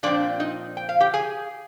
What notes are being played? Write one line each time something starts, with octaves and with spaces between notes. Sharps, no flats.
A#2 F3 C4 D4 D5
D#4 D#5
G5
F5
G4 G5
G#4 G#5